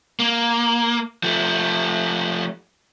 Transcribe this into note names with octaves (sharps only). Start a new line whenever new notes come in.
A#3
F3 A3